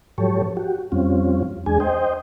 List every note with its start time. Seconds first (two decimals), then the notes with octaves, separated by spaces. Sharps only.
0.18 G#2 F3 F#3 G4 A4 C#5
0.57 F#4 G4
0.92 F2 G3 C4 C#4 F4
1.66 E2 G#3 D4 G#4 G#5
1.80 C5 D#5 G5